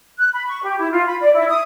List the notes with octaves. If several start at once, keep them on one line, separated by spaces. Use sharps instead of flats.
F#6
B5
C#6
G4
E4
F4
B5
D5
E4
D#6